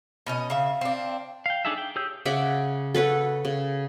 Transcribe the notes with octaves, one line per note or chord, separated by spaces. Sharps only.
B2 C#4 D#5
C#3 E5 F5
C4 D4
F5 G5
D4 D#4 G#4 A4 E5
G5
G4 G#4 C#5 E6 G6
C#3 E5 F#5 D6
A4 B4 C#5 F#5
C#3